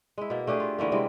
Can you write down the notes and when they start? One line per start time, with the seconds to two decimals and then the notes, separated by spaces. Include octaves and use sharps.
0.18 G#3 E4
0.30 B2 A#3
0.47 A3 D4 G4 G#4
0.60 F4
0.78 D3 E3 A3 A#3
0.92 C3 E3 G3 G#3